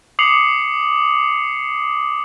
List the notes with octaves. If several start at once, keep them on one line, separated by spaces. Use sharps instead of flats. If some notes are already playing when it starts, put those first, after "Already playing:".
D6 D#6 C7 C#7 F7 F#7